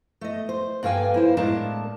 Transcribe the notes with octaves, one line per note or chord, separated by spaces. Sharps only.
A3 D#5
C5
G2 A#3 A4 F5 G5 G#5
A#3 E4 C5
A2 G#3 A#3 D4 A#4 A5